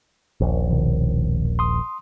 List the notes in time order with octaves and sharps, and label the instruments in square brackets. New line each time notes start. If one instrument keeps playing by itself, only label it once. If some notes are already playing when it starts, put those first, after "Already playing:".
[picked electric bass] D#1 A#1
[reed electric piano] B2 D#3
C6 D#6